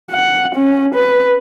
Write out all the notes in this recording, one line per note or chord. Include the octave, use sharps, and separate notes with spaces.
F#5
C#4
B4